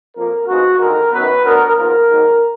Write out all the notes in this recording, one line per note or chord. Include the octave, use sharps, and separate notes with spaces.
F2 F3 A#3 A#4
A#1 G#2 F3 G#3 B3 F#4
D#2 D3 G#3 A#4
F#2 D#3 F#3 B3 B4
D2 D3 F#3 B3 A#4
G#1 G#2 F3 B3 A#4
G#2 D#3 F#3 A#3